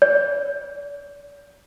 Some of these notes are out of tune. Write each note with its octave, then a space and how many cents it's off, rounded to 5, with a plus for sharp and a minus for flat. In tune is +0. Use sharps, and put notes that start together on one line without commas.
D5 -40